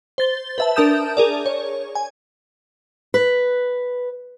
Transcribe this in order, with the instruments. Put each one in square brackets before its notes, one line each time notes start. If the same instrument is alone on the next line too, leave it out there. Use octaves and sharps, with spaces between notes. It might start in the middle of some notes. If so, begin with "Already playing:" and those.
[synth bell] C5 A6 G7
B4 E5 A5
D4 A#4 A5 D#6 G6 E7
G#4 A#4 D5
C#5
G#5
[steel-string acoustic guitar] B4